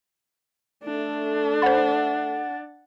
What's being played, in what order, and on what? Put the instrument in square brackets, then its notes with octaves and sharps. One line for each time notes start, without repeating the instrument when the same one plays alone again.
[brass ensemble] A3 A4 [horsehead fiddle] D4
[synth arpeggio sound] C5 B5 [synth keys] F#5 A6